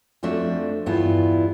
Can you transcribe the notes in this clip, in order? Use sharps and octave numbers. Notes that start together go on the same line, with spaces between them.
F2 F3 A3 D4 F#4 E5
E2 G2 B3 E4 F4